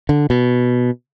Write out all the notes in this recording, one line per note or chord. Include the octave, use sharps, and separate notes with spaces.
D3
B2